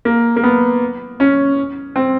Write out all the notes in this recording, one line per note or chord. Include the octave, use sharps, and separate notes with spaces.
A#3
A#3
B3
C#4
C4